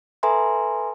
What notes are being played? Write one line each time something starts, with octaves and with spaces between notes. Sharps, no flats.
A4 B4 E5 G#5 A#5 C6